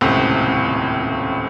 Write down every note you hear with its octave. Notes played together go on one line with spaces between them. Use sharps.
D#1 C#2 A2 C3